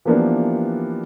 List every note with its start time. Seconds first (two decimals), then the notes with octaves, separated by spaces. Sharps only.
0.05 E3 F3 A#3 B3 D4 G4